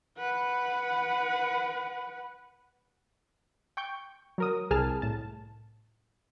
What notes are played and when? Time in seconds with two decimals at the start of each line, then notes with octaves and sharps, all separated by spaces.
0.18 B4 F#5
3.77 G5 C#6 G6
4.38 F#3 A#4 D#6
4.71 C2 G#4 A#4 G#5 A5 F6
5.02 A2 A5